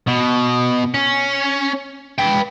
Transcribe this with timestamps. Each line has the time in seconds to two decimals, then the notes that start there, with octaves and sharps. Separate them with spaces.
0.07 B2
0.94 C#4
2.19 B4 G5